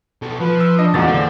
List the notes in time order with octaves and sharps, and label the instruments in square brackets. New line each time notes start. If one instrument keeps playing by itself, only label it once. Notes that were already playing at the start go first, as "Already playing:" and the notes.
[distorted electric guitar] B2 A4
[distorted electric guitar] F3 [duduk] B4
[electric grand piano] E6
[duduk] D4 [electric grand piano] D#5
[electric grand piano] E2 A#2 A6 [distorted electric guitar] C#3 G#3 [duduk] F#4
[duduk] D3 [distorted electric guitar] C4